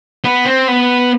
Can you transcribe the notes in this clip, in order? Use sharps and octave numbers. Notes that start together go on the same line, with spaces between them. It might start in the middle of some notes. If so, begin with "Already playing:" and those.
B3
C4
B3